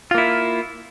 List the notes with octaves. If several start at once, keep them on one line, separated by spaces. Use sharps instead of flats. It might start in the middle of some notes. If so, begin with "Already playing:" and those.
A#3 E4 F4